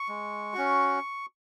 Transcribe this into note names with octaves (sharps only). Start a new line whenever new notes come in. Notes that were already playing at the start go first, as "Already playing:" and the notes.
Already playing: C#6
G#3
C#4 F#4